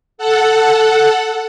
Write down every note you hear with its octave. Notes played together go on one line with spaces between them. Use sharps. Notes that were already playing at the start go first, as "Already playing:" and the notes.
A4 F#5